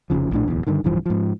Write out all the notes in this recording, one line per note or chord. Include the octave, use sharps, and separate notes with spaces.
F1 B1 C#3 F3
A#1 A2 D4
D1 B1 E2
G2 D3 D#3
D1 G2 E3 F3
G#2 F3